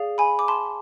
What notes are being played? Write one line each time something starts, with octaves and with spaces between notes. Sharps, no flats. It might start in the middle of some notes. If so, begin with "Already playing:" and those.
Already playing: G#4 D5 F5
G#5 B5
D6
A5 C6